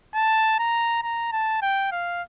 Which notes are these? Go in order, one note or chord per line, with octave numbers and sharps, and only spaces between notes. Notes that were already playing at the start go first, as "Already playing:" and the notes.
A5
A#5
A#5
A5
G5
F5